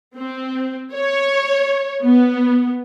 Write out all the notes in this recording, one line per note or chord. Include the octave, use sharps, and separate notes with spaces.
C4
C#5
B3